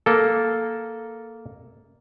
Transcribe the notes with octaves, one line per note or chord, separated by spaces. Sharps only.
A#3 A4